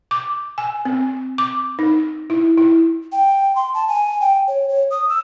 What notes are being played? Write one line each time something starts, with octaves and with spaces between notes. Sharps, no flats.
D6
G#5
C4
D6
D#4
E4
E4
G5
C6
A5
G#5
G5
C#5
C#5
D#6
E6